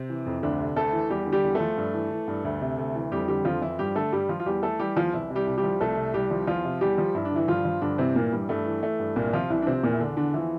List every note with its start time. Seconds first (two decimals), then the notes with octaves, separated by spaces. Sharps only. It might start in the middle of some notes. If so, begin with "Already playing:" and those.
Already playing: C3 C4
0.09 E3
0.26 F2
0.43 D2 D3 D4
0.60 C3
0.76 D2 A3 A4
0.93 E3
1.10 E2 G3 G4
1.27 D3
1.32 G3 G4
1.44 E2
1.55 A3 A4
1.60 F3
1.78 G2
1.94 E3
2.11 E3
2.28 G2
2.45 D2
2.61 C3
2.78 D2
2.95 E3
3.11 F2 G3 G4
3.28 D3 G3 G4
3.45 F2 F3 F4
3.62 E3 F3 E4
3.79 G2 G3 G4
3.95 D3 A3 A4
4.12 G2 G3 G4
4.29 F3 F4
4.40 F4
4.46 E2 G3 G4
4.63 E3 A3 A4
4.79 E3 G3 G4
4.96 E2 F3 F4
5.13 C2 E3 E4
5.30 C3
5.35 G3 G4
5.47 C2
5.58 G3 G4
5.64 F3
5.81 C2 A3 A4
5.97 C3
6.14 C2 G3 G4
6.31 F3
6.47 E2 F3 F4
6.65 C3
6.81 E2 G3 G4
6.98 F3
7.15 G2 E4
7.25 D4
7.31 D3 E3 E4
7.48 G2 F3 F4
7.65 F3
7.82 G2 D3 D4
7.98 C3 E3 C4
8.16 A#2 E3 A#3
8.32 G2 G3
8.49 G2 A3
8.66 E3
8.83 E3 A3
8.99 G2
9.16 C2 A#2 A#3
9.33 C3 F3 F4
9.50 C2 E3 E4
9.62 D4
9.67 C3 F3 C4
9.83 E2 A#2 A#3
9.93 E4
10.00 D3 D4
10.17 E2 D3 D4
10.34 E3 F3 E4